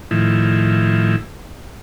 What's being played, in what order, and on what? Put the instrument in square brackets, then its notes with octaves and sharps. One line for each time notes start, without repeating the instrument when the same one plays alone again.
[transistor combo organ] A2 D#3 F3 E4